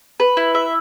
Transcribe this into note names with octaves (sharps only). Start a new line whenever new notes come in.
B4
E4
E5